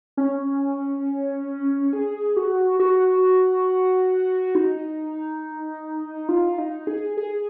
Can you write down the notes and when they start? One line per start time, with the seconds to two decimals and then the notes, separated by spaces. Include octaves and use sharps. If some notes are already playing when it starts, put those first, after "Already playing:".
0.17 C#4
1.93 G#4
2.37 F#4
2.80 F#4
4.55 D#4
6.29 F4
6.58 D#4
6.87 G#4
7.17 G#4